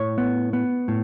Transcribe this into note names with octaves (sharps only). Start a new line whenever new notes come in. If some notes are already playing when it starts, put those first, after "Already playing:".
Already playing: A2 C#5
B3
B3
A2